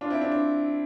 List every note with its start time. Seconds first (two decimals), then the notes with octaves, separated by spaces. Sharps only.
0.01 D4 F4
0.10 C4 E4
0.21 D4
0.32 D4